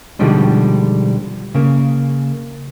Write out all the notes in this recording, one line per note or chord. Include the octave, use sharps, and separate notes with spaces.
B2 D3 D#3 F3 G3 G#3
C#3 A#3